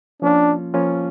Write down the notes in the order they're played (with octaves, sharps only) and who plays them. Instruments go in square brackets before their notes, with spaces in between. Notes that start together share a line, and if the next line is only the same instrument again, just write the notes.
[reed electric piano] F3 A#3 C#4 F4 [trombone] D4
[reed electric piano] F3 A#3 C#4 F4